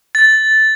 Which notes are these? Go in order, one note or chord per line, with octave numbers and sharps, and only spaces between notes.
A6